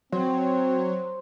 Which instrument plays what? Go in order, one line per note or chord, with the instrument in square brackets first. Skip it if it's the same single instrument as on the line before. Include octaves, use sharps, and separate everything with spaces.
[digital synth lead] F#3 [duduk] C4 [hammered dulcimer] C5